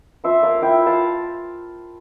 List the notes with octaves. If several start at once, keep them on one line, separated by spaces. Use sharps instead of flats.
F3 C5 E5
A#3 D5 F5
E4 E5 G5
E4
F5 A5